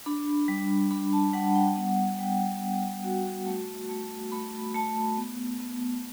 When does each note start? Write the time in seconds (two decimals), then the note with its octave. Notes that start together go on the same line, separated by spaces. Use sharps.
0.06 D4 B5
0.48 G3
0.91 D4 B5
1.13 A5
1.33 G3 F#5
1.55 G5
1.76 B3 F#5
2.19 G3 G5
2.61 B3
3.04 F#4
3.46 A3
3.89 A3
4.32 A3 B5
4.75 A3 A5
5.17 B3
5.60 B3